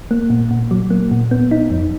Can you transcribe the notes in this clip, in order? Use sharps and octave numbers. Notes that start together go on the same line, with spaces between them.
A#3
A#2
A#2
F#3
A#3
A#2
B3
D#4
F2